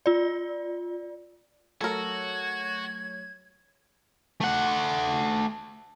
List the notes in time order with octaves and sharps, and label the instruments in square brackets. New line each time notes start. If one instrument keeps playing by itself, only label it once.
[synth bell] F4 D5
[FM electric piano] F#3 A3 C#5 [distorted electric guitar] F#4 [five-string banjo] A4 A#4 [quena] G#6
[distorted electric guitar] A3 F#5